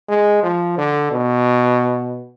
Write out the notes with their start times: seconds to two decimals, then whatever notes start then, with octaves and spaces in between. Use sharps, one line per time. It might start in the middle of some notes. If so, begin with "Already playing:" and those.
0.09 G#3
0.43 F3
0.78 D3
1.12 B2